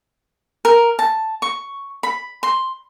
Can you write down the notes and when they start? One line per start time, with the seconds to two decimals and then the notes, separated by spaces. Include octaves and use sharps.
0.65 A#4
0.99 A5
1.42 C#6
2.03 B5
2.43 C6